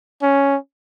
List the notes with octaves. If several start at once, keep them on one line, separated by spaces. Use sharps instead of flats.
C#4